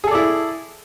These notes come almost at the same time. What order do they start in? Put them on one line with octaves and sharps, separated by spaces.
G#4 A4 D5 E4